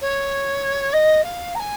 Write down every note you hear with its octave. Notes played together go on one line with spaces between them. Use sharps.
C#5
D#5
F5
A#5
G#5